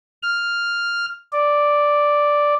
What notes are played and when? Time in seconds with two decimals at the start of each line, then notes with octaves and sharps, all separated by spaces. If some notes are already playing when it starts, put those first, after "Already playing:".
0.23 F6
1.32 D5